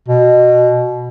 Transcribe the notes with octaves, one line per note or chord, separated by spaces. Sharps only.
B2